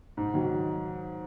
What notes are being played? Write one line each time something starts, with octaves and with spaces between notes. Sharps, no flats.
G#2
D#3 F#3